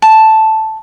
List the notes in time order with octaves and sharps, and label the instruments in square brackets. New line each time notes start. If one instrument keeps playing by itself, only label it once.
[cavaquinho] A5